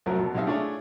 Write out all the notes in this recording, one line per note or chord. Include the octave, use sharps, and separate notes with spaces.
C2 F#2 F3 F#3 A3 A#4
F2 B2
B1 C3 D#4 E5 F5
A3 D4 E4 F4 G#4 C#5